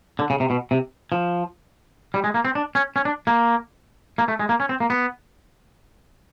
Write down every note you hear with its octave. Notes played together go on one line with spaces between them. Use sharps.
D3
C#3
C3
B2
C3
F3
G3
G#3
A#3
C4
D4
C#4
C#4
D4
A#3
A#3
A3
G#3
A#3
C#4
C4
A#3
B3